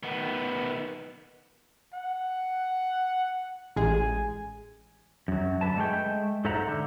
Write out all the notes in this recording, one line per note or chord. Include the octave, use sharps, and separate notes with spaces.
D#3 B3
F#5
A1 G#3 G#4 G#5
F#2 F#3
D3 B4 A5
G#3 A3 G#4 F5 G5
G#2 A4 C5 E5 F#5 A#5
D3